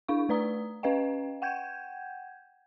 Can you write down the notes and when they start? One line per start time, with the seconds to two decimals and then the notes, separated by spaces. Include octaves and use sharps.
0.08 D4 E4 F5 C#6
0.29 A3 B4 D5 A#5 D#6
0.83 C#4 B4 D#5 F5 G5
1.42 F#5 G5 G6 G#6